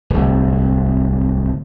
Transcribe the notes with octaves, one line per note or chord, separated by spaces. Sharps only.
D1 C2